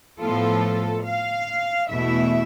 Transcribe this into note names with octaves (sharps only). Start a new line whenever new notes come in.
A2 F3 B3 F4 A4
F5
E2 B2 A3 E4 E5